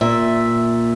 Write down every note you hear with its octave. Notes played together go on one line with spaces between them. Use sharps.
A#2 E5